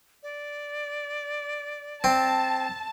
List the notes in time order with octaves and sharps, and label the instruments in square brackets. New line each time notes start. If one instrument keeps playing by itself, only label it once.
[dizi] D5
[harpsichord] C4 [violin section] A5